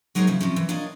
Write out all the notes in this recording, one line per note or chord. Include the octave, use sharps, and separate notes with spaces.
F#3 G#3 D#4 A#4 C5 C#5
C#3 F3 E4
C3 F3 C#4
E3
D4 F4 A#4 C#5 D#5